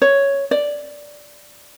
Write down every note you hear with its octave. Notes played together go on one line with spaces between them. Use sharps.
C#5
D5